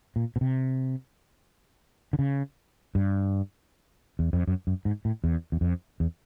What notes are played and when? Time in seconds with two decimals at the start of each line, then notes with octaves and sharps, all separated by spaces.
0.16 A#2
0.36 B2
0.41 C3
2.13 D3
2.19 C#3
2.95 G2
4.19 E2
4.33 F2
4.47 F#2
4.67 F#2
4.85 G#2
5.05 A2
5.24 E2
5.52 E2
5.61 F2
6.00 E2